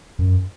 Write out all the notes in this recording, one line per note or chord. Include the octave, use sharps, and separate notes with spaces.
F#2